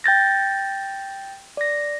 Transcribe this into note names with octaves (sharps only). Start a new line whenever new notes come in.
G5 G6 A6 A#6
D5 A#6